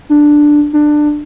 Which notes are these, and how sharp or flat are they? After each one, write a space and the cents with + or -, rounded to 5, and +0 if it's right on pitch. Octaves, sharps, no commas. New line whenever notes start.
D4 +5
D4 +20